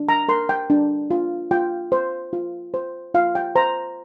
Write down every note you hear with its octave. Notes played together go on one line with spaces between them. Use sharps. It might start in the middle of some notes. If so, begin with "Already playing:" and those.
Already playing: D4
A#5
A#4 C6
G5
D4
F4
F4 G5
C5
F4
C5
F4 F5
G5
C5 A#5